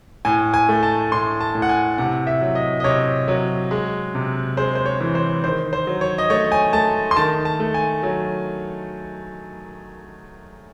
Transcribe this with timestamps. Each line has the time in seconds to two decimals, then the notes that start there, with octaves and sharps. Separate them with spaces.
0.25 A2 G#5
0.54 G#5
0.69 A3
0.83 A5
1.12 A2 C6
1.41 A5
1.55 A2
1.62 F#5
1.69 G#5
1.98 C3 F#5
2.27 E5
2.41 F#3
2.55 D#5
2.80 D#5
2.84 C3 C#5
3.28 F#3
3.71 G#3
4.14 C3
4.57 G#3 C5
4.75 C5
4.86 C#5
5.01 E3
5.15 C5
5.44 D#3 C5
5.73 C5
5.87 F#3
6.01 C#5
6.18 D#5
6.30 A3 C#5
6.52 G#5
6.73 A3 A5
7.11 C6
7.16 D#3 A5
7.45 A5
7.60 A3
7.74 G#5
8.03 F#3